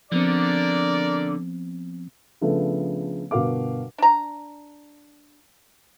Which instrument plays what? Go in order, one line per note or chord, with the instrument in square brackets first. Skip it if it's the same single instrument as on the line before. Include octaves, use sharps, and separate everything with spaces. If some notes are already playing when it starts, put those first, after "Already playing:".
[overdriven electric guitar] D3 [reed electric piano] F3 B3 C4 [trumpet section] A#4 D5
[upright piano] C#3 F3 A3 B3 D4
G1 B2 F#4 A#4 F5 D6
[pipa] D4 A#5